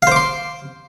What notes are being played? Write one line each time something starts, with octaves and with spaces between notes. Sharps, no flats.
C5 F5 C6 D6